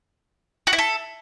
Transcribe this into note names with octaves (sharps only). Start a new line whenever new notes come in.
F#4
E4
A4